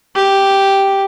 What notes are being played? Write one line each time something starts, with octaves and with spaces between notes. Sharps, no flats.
G4